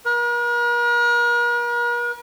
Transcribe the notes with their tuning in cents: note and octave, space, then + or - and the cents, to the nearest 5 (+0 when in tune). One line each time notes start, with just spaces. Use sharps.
A#4 +45